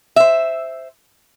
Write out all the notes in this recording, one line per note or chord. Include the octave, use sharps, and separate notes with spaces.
C5 E5